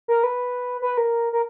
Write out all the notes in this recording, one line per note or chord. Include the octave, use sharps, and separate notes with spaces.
A#4
B4
B4
A#4
A#4